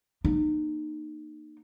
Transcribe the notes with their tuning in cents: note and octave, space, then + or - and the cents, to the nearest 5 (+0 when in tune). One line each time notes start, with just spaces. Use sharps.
A#3 +0 D#4 -35